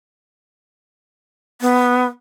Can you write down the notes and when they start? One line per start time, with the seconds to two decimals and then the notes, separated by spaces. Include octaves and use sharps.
1.61 B3